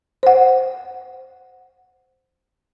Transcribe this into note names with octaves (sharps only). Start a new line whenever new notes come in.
C5 F#5